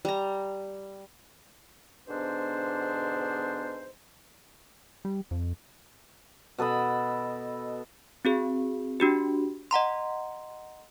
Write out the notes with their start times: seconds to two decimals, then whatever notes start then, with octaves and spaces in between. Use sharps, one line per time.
0.05 G3 A#5
2.08 G#2 B2 D3 B3 D4 C5
5.05 G3
5.31 F2
6.58 B2 A4 D#5 B5
8.25 C4 F#4 G#4
9.00 D4 F#4 G4
9.71 D#5 F#5 A#5 C6